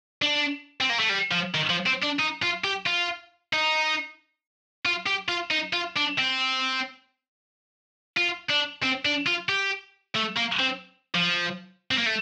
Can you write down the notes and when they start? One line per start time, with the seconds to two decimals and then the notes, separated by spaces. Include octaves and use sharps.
0.22 D4
0.81 C4
0.90 A#3
0.99 A3
1.09 G3
1.31 F3
1.55 D#3
1.70 F3
1.87 C4
2.03 D4
2.20 D#4
2.43 F4
2.64 G4
2.86 F4
3.53 D#4
4.86 F4
5.07 G4
5.29 F4
5.51 D#4
5.73 F4
5.96 D4
6.18 C4
8.17 F4
8.50 D4
8.83 C4
9.05 D4
9.27 F4
9.49 G4
10.16 A3
10.37 A#3
10.60 C4
11.15 F3
11.91 C4
11.98 A#3
12.06 A3